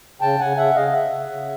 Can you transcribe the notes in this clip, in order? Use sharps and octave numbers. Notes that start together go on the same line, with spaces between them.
C#3 G5 A5
C#3 F#5 G#5
C#3 E5 F#5
C#3 D#5 F5
C#3 E5 F#5
C#3
C#3